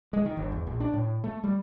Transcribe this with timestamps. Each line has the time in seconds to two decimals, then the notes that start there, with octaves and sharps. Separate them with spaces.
0.13 G#3
0.25 D#3
0.37 G1
0.52 E2
0.67 A#1
0.80 D4
0.94 A2
1.24 A3
1.44 G3